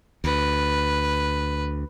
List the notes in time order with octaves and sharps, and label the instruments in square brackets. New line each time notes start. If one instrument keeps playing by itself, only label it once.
[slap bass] D2 [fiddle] B4